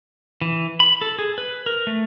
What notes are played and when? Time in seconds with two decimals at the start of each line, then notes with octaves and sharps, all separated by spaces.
0.41 E3
0.80 B5
1.01 A4
1.19 G#4
1.38 B4
1.66 A#4
1.87 A3